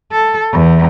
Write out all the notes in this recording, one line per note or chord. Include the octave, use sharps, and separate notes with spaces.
A4
E2